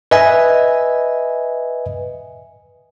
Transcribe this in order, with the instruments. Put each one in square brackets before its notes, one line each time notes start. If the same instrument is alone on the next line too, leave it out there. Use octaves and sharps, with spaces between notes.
[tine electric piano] B4 D#5 E5 G#5